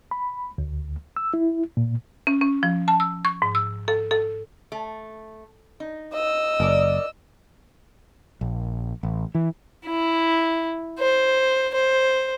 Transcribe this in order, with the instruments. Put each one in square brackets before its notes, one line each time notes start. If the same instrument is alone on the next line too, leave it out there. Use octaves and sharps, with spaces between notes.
[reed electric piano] B5
D2
E6
E4
A#2
[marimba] C#4
C#4
F3
A5
E6
C#6
G#2
E6
A4
A4
[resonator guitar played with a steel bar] A3
D#4
[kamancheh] D#5 E6
[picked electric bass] F#1 [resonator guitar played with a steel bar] A#4 D5
[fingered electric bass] A#1
A1
E3
[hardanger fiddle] E4
C5
C5